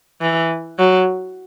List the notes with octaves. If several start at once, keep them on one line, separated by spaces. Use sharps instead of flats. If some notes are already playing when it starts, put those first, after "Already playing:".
E3
F#3